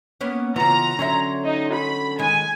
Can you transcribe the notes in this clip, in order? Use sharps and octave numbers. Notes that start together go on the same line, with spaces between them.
A#3 B3 C#4
C#3 E3 B3 F4 A#5
D3 F#3 C#4 C#5 E5 C6
D#4
B5
D#3 G#3 G#5